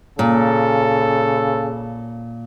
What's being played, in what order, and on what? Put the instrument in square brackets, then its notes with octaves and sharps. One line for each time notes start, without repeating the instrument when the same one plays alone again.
[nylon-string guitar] A#2 [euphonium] C#3 [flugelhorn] A4